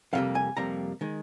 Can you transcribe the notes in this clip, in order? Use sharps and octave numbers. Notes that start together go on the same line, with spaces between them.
F2 C3 G3 A#3 F5
G#5
F2 C3 G3 A#3 A#5
D#3 G#3